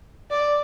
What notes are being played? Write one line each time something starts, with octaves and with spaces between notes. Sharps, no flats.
D5